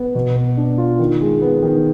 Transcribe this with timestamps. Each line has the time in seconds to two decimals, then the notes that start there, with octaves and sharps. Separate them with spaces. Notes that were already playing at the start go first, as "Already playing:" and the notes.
Already playing: B3
0.15 B2
0.37 B3
0.57 D4
0.78 F4
0.99 D#3
1.21 G#3
1.42 B3
1.63 D#3